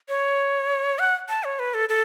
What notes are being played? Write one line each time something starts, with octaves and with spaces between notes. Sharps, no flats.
C#5
F#5
A5
C#5
B4
A4
A4